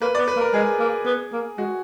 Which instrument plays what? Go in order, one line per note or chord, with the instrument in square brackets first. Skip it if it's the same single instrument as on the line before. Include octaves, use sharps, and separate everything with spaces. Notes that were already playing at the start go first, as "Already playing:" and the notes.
[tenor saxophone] A#3 [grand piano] B4
[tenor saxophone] B3 [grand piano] D5
[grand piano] B4
[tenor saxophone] A#3
[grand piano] A#4
[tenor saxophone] G#3 [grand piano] G#4
[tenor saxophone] A#3
B3
A#3
[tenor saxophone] G#3 [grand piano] F#4